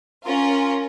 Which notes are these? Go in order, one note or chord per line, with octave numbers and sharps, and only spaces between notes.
C#4 F4 A#4